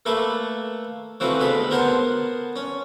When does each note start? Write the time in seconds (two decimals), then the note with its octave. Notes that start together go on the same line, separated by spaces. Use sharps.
0.06 A3 A#3 A4 B4
1.20 E3 F3 A3 C4 F#4 B4
1.39 D2 B2 G#3 A4 B5
1.70 B3 A#4 C5 F#5 G#5 A5
2.56 C#4